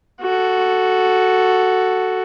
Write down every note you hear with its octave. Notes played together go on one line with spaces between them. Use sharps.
F#4 A4